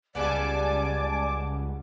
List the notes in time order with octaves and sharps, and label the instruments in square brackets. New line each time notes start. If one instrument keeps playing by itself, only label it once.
[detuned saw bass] C#2 [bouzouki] C#3 G3 B3 [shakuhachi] D5 [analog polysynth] G#5 A5 D6